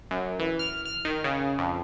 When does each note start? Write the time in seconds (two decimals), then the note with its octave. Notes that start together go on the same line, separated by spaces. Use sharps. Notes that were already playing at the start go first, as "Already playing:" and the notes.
0.11 F#2
0.39 E3
0.59 F6
0.85 F6
1.05 D#3
1.24 C#3
1.58 F2